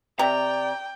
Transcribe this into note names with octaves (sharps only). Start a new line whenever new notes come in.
C3 D5 G5 A#5